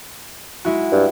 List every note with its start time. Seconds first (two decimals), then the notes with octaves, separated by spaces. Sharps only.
0.65 G#3 E4 F#4
0.92 G2